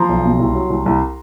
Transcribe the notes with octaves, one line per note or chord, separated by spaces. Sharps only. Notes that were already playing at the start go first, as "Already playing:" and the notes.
Already playing: F3 A#5 C6
B1
B2
C2
F#3
C2
C2